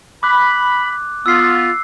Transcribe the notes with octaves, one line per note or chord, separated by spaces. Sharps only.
B5 D6 F#6
B3 F4 E6 C7